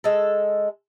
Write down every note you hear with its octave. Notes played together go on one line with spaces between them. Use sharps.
G#3 A4